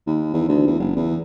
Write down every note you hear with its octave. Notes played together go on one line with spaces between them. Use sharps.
D#2
E2
D2
E2
F#1
E2